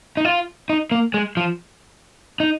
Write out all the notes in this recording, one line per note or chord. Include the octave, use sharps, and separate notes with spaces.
D#4
F4
D#4
A#3
G#3
F3
D#4